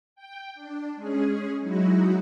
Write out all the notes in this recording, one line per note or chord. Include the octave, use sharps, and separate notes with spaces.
G5
D4
G#3 C#4 G#4
F#3 G#3 D#4 E4 F#4